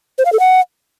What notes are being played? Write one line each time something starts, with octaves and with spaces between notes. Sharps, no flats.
C5
F5
A4
F#5